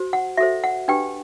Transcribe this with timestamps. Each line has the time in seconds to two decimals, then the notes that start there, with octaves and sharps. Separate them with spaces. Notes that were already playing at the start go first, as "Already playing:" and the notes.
Already playing: F#4 C5
0.13 F#5
0.37 F#4 A4 C5 E5
0.64 F#5
0.88 D4 G4 B4 G5